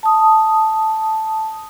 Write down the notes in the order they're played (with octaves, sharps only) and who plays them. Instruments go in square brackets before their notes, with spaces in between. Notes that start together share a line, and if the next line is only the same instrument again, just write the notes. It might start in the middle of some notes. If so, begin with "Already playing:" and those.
[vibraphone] A5 D#6